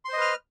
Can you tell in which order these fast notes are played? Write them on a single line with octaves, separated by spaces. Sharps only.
C6 C5 D#5 B4 F6